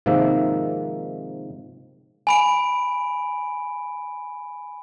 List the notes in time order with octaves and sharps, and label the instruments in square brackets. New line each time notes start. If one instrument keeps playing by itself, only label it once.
[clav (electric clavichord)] G#2 C3 D#3 F3 A#3 E5
[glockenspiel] G#5 B5 D7